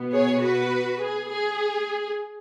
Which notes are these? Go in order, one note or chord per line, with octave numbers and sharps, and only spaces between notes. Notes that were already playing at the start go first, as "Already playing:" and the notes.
Already playing: B2 B3
G#4 C#5
F#4 B4
G#4
G#4